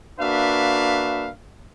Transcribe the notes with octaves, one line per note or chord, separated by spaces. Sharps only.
A#3 D4 F#4 B4 E5 F5